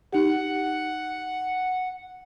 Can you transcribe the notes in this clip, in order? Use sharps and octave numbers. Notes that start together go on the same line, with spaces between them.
D#4 G4 F#5